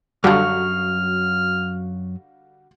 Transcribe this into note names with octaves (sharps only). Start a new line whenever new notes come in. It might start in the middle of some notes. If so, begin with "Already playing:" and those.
F#2 D3 F#3 G3 F#4 F5 F6